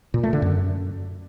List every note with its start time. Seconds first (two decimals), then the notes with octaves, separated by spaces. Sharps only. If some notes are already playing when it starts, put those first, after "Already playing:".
0.14 A#2
0.23 A3
0.33 D3
0.42 F#2